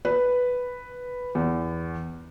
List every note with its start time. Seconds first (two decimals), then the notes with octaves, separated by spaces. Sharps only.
0.05 B4
1.35 E2